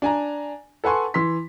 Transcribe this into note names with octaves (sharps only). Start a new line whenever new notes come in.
D4 G#5 A#5
A4 B4 F#5 G#5 C6 C#6
E3 C6 B6